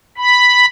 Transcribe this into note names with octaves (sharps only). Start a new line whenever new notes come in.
B5